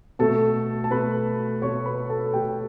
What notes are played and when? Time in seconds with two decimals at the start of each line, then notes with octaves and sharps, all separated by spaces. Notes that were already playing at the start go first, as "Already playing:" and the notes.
0.19 B2 A3 A4 A5
0.84 A5
0.91 B2 A3 B4 B5
1.62 B2 A3 C#5 C#6
1.86 B4 B5
2.10 A4 A5
2.33 B2 A3 G4 G5